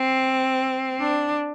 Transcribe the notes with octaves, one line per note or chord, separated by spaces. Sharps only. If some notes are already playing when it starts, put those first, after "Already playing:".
Already playing: C4
D4